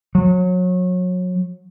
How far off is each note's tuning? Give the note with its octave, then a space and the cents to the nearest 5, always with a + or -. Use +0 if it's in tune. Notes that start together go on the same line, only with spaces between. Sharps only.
F#3 -30